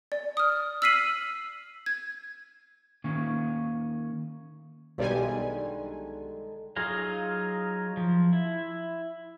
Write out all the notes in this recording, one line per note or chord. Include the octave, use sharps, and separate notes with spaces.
D5
D#6 F6
E6 F6 B6 C7 D#7 F#7
G#6
D#3 A#3 C#4
B1 D3 D#3 G3 G#3 G#5
F#3 D#4 F4 G#4 F5
F3
E4